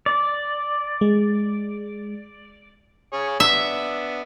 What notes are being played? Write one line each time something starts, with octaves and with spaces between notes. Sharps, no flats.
D5
G#3
G#4 C#5
B3 D4 E5